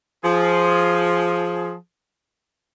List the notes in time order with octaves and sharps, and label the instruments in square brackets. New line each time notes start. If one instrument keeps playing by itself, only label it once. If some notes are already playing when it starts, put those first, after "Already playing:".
[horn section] F3 G#4